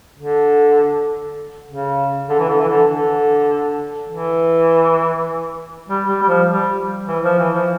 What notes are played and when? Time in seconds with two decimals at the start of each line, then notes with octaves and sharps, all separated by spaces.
0.18 D3
1.69 C#3
2.29 D3
2.39 E3
2.49 D3
2.59 E3
2.69 D3
2.89 D3
4.09 E3
5.89 G3
6.09 G3
6.23 G3
6.28 F3
6.49 G3
7.08 E3
7.24 F3
7.39 E3
7.54 F3